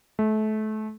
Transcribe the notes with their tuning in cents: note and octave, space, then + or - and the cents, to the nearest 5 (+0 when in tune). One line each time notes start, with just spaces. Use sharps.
A3 -30